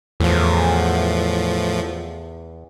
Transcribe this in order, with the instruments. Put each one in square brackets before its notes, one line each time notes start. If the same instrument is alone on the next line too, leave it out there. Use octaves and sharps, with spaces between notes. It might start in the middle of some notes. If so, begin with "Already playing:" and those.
[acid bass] E2 [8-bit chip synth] A2 F3